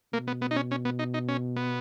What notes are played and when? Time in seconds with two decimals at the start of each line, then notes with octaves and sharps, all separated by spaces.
0.13 B2 A#3
0.27 B3
0.42 B3
0.51 D#4
0.56 C#4
0.71 C#4
0.85 B3
0.99 D#4
1.14 D#4
1.28 C#4
1.56 B3